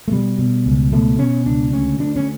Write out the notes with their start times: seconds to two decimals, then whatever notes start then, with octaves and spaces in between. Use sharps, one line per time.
0.08 A3
0.11 B2 G3
0.39 B2
0.66 C#2
0.92 B2 A3
1.19 B2 C#4
1.46 C#2 D4
1.73 D2 C#4
1.99 D2 D4
2.16 C#4